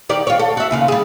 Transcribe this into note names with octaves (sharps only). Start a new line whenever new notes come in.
D#3 G4 D5
F4 C#5
A4
F#4 E5
D#2 C#3 F4
G3 G#4